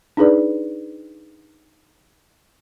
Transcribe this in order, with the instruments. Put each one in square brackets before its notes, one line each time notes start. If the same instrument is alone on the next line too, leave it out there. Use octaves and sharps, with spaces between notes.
[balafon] D4 D#4 G#4 B4 D5